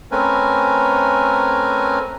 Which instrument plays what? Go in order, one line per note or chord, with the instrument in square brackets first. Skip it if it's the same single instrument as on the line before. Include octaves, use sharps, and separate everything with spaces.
[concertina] A3 C4 C#4 A#4 B4 G#5